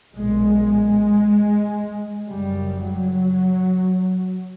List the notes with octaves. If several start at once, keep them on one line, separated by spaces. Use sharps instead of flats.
B1 A#2 G#3
G#3
F#1 F#2 C#3 G3
F#3